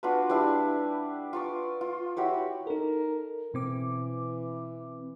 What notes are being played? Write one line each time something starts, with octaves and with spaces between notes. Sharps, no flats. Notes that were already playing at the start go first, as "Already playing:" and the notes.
D4 F4 F#4 B4
G3 D4 E4 F5
F4 D5 C#6
F4
E4 F#4 G4 C#5
D#4 A4 A#4
B2 E3 C4 D6